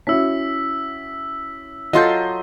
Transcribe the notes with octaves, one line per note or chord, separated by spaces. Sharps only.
C#4 E4 F#4 E6 B6
F#3 F4 A4 D#5 C6 G6